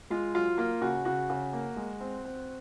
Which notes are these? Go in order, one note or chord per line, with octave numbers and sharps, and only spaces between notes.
G#3 F4
F#3 F4
A#3 F4
C#3 F#4
C#3 F#4
C#3
A#3
G#3
C4
C4